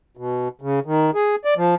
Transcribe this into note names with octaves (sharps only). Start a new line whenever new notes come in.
B2
C#3
D#3
G#4
D5
F3